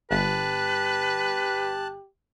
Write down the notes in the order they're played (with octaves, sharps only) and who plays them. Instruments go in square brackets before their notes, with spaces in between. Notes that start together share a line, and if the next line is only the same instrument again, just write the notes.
[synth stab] G1 [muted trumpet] G4 [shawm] B4 [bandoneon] A5 F#6